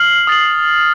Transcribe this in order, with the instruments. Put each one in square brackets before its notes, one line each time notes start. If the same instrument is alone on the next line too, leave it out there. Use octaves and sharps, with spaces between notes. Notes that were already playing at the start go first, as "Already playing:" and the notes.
Already playing: [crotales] F6 C7 F#7
D#6 A6 C7 F#7